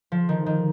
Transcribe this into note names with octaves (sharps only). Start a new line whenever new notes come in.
F3
D#3
D#3